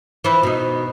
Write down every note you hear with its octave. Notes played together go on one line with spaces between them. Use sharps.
E3 F3 E4
B2 D#4